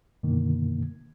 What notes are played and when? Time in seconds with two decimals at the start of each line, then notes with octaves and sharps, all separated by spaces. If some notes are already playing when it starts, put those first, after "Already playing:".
0.23 F#2 B2 D3 D#3 A#3